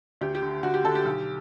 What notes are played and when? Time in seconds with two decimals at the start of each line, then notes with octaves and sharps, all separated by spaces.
0.21 D2 G4
0.35 G4
0.42 D3
0.63 D2 F#4
0.74 G4
0.84 D3 A4
0.95 G4
1.05 B1